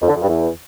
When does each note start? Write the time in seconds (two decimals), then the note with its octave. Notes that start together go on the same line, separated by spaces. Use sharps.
0.02 F2
0.08 D3
0.15 F2
0.21 G2
0.28 E2